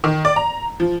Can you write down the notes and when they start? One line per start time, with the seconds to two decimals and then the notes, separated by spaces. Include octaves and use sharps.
0.04 D#3
0.25 D5
0.36 A#5
0.80 F3